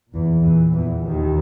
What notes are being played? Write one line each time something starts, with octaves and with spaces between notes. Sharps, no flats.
E2 A#2 E3
E2 E3
E2 E3
D#2 D#3